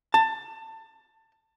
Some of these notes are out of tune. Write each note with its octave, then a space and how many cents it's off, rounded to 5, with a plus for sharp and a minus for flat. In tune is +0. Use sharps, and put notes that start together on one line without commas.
A5 +20